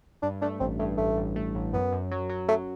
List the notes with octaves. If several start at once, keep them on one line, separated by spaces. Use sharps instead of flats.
G2 D4
A3 D4
A1 C4
G2 A3
A1 A3
A1
A3
A1
F#2 B3
F#2
F#3
F#3
F#3 A3